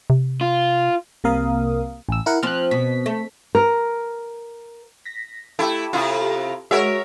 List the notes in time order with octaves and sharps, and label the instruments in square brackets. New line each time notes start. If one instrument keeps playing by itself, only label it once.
[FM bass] C3
[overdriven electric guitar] F4
[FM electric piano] C2 C3 A#3 A#4 F5 D#6
A1 E6
E4 A#4 F#5
[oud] F3 C4 [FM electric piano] F6 F#6
[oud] B2 [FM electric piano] B6
[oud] A3
[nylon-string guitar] A#4
[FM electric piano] A#6 B6
[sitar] A3 E4 [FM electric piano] G4 A4
[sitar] C3 E4 F4
[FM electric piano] G#3 F#4 [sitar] A#4 C#5 E5